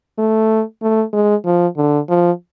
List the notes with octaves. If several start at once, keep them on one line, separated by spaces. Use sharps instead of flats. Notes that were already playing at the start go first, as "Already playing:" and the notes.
A3
A3
G#3
F3
D3
F3